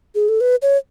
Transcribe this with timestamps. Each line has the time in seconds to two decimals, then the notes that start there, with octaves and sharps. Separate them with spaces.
0.15 G#4
0.29 A4
0.41 B4
0.62 C#5